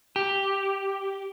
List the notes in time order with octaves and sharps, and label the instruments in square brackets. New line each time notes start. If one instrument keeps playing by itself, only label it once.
[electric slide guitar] G4